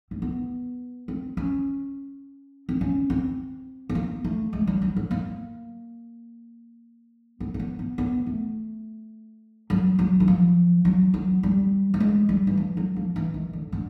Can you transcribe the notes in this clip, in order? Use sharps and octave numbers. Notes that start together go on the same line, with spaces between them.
C4
B3
C4
C#4
C4
C#4
C4
B3
A#3
A3
G#3
G3
F#3
F#3
A#3
B3
A#3
B3
B3
B3
A3
F#3
F#3
E3
F3
F#3
F#3
G3
A3
G#3
G3
E3
F3
F#3
F3
E3
D#3
D3
D3